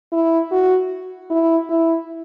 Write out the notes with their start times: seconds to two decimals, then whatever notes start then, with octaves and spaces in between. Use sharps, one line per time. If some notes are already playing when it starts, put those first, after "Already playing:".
0.12 E4
0.52 F#4
1.30 E4
1.70 E4